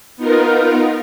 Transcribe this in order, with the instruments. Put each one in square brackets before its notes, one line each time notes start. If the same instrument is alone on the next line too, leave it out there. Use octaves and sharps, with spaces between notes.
[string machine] B3 D#4 F4 A#4